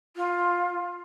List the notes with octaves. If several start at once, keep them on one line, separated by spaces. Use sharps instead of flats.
F4